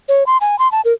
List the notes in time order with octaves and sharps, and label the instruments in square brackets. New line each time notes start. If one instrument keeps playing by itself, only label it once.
[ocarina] C#5
C6
G#5
C6
A5
A#4